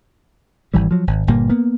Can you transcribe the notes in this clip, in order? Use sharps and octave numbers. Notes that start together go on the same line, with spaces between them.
G#1 E3 G3
F3 F#3
G#1
G1 A#2 G3 A#3
A#3 B3